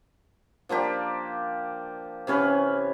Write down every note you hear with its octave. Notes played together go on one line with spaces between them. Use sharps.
F3 A#3 D4 G4
C3 E3 C#4 B4